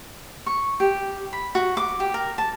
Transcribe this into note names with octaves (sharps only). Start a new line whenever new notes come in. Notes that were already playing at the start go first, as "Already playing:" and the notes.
C#6
G4
B5
F#4
D6
G4
A#4
A5